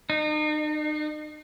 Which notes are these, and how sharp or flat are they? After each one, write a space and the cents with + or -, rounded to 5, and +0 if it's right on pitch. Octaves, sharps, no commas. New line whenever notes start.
D#4 -40